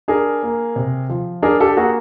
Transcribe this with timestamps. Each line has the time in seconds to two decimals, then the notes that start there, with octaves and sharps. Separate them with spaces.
0.08 D4 G#4 A#4
0.43 A#3
0.76 C3
1.09 F3
1.42 D4 G#4 A#4
1.60 G4 A4
1.77 A#3 F#4 G#4